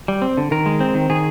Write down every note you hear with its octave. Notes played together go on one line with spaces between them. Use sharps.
G3
C4
D3
D#3 A#4
G#3
C4
D#3
D#3 G#4